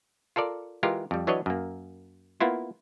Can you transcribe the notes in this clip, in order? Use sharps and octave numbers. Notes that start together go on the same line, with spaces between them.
F4 A4 A#4 D5
E3 G#3 F4 G4 A#4
F2 G3
E3 F#3 D4 B4 C#5 D#5
F#2 A#3
A#3 B3 E4 F4